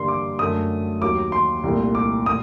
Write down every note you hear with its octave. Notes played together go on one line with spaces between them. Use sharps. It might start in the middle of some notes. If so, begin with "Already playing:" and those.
Already playing: G2 D3 G3 A#3 C6
D6
F#2 D3 F#3 A3 D#6
D#2 D#3 F#3 D6
C6
C2 A#2 A3
D6
A#2 D#6